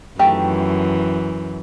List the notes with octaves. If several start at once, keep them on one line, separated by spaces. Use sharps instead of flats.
F#2 D#3 E3 A3 G4